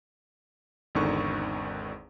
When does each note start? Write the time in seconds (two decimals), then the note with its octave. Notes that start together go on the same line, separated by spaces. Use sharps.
0.95 G#1 E2 D3 D#3 C#6